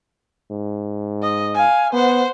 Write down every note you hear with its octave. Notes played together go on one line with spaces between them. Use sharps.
G#2
D#5
F5 G#5
B3 C5 F#5